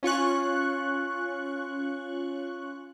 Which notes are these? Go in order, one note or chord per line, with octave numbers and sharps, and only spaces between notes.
C#4 F4 C#6 F#6